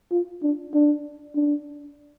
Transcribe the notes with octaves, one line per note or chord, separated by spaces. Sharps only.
F4
D4
D4
D4